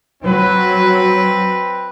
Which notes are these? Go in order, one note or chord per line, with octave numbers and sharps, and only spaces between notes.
F#3 C4 B4